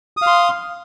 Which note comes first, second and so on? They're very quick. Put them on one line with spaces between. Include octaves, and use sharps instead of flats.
D#6 F5 C6